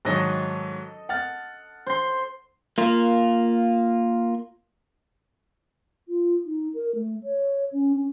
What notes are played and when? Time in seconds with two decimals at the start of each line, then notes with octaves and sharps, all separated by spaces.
0.05 G#2 D#3 F#3 A4 D#5
1.09 F#5 F6 A6
1.86 C5 C6
2.78 A#3 F4
6.08 F4
6.46 D#4
6.74 A#4
6.95 A3
7.23 C#5
7.72 C#4
7.95 C#4